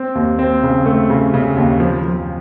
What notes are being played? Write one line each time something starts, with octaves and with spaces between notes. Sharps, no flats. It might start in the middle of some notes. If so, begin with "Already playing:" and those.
Already playing: C4
D#2
C4
C#3
A3
C#3
C#3
D#2
F3
F3